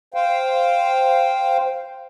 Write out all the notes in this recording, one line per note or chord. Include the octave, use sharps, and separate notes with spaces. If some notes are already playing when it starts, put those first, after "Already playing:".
C5 F5 G5